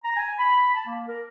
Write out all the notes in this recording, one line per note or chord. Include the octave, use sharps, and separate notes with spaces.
A#5
G#5
B5
A5
A#3
A#4